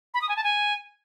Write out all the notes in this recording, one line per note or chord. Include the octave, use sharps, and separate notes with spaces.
B5
D#6
G#5
A5
G#5